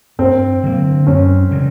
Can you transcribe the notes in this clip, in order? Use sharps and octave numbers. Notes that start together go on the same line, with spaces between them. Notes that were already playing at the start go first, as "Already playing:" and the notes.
G2 C4
D3 F#3 A#3
F#2 C#4
C#3 E3 G3